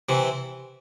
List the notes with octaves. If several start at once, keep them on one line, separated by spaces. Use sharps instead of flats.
C3 E3